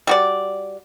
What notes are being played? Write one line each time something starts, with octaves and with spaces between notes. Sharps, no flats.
G3 F#4 D5